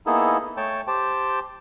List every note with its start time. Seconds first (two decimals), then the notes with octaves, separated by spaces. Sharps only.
0.06 A#3 B3 D#4 E4 G#4 A4
0.57 A3 C#5 G5 A5
0.88 G4 C5 G5 A5